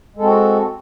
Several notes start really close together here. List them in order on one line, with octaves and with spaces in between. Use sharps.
G#3 A4 C4 F#4